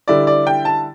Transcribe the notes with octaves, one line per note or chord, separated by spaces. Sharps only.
D3 G3 E4 D5
D5
G5
A5